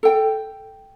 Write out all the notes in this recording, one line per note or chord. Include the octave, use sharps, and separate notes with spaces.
A4 G5